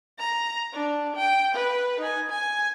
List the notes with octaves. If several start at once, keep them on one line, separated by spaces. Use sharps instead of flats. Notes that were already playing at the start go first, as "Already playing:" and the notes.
A#5
D4
G5
B4
D#4 G#5
G#5